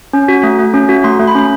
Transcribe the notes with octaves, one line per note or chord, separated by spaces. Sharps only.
C#4
F#4
A3
A3
C#4
F#4
A3 C6
A3
B5
C#4